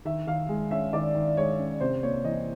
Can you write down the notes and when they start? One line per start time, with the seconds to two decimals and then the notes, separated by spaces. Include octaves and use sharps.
0.05 D#3 E5
0.27 D#3 F5
0.49 G#3
0.71 C#4 E5
0.93 D#3 D5
1.15 D#3
1.37 G#3 C#5
1.59 C#4
1.81 C3 C5
2.03 A#3 C#5
2.24 E3 D#5